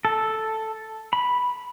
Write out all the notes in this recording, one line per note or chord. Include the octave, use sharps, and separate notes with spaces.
A4
B5